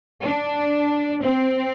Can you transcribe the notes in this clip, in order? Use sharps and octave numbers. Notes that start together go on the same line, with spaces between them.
D4
C4